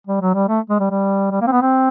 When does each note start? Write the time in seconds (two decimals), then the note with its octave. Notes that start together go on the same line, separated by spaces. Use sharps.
0.07 G3
0.21 F#3
0.35 G3
0.49 A3
0.70 G#3
0.79 G3
0.90 G3
1.31 G3
1.41 A#3
1.47 C4
1.52 B3
1.62 C4